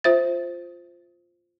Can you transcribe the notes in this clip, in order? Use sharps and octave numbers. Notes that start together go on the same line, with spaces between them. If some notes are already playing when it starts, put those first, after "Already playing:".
F4 C5 E5 A6